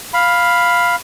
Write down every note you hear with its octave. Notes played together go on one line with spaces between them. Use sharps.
F5 B5